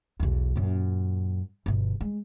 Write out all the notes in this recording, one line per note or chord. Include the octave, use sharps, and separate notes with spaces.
B1 E2
F#2 A#2
G1 B2
G#3